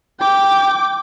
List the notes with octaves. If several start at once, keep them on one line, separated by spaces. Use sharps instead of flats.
G5 D6